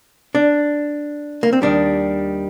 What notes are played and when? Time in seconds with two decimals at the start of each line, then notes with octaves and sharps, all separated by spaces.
0.35 D4
1.43 A#3
1.53 C4
1.62 D#2 D#3 G3 D4